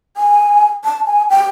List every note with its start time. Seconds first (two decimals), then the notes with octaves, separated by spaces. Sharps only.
0.17 G#5
0.85 A5
1.07 G#5
1.30 G5